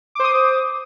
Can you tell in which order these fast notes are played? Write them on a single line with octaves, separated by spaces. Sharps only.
D6 C5 D#6